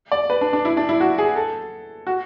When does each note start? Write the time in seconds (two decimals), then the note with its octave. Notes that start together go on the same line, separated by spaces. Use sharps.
0.12 D5
0.30 B4
0.41 D4
0.53 D4
0.65 E4
0.77 D4
0.89 E4
1.00 F#4
1.18 G#4
1.36 A4
2.07 F#4